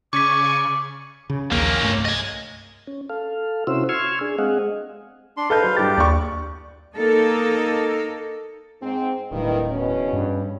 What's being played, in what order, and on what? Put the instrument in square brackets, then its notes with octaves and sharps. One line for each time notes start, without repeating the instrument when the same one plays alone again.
[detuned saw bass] C#3 [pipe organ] D5 G#5 [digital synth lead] C#6 [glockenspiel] D6 B6
[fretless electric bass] C#3
[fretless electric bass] A#1 D#2 [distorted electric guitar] A#3 C#4
[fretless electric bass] C2 G2 A3
[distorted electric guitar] D#5 G#5
[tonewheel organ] C#4
A4 F5
C3 C#4 E4 F#4 C5 E6
C6 C#6 E6 F6 G#6
D4 G#4
G#3 C4 G#4 D#5 F5 F#5
[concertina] D4 C6
[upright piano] A4 D#5 G6 [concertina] B4 F5
[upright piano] F#3 C5
[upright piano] G2 A6 [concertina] G4
[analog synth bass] D#2 [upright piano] D5 C#6
[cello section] A#3 D#4 A4
[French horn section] G#2 C4
[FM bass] D1 [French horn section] G2 D#3 E4
[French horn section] E2 B2 C#4
[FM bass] G2